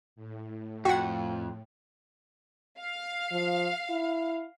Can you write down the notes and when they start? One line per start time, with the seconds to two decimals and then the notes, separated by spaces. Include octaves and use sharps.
0.16 A2
0.85 F2 F#4 F#5 G5
2.81 F5
3.32 F3
3.90 E4